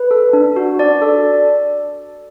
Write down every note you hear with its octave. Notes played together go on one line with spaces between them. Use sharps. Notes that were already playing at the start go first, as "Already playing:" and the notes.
Already playing: B4
A4
D4
F#4
D4 D5
A4